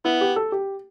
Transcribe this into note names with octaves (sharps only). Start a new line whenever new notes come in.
B3 E4
G4
A4
G4